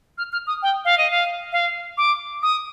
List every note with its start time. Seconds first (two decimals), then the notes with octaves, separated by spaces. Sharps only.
0.18 F6
0.33 F6
0.47 D#6
0.63 G5
0.85 F5
0.98 D#5
1.11 F5
1.52 F5
1.98 D6
2.43 D#6